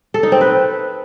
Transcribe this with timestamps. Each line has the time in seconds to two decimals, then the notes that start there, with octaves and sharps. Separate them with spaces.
0.14 A4
0.23 D#4
0.32 C4
0.41 B4